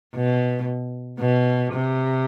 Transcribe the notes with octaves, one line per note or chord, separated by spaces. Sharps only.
B2
B2
C3